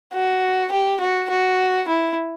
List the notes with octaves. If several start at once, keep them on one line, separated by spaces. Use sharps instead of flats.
F#4
G4
F#4
F#4
E4